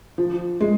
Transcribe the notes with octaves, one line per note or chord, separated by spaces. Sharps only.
F3
G#3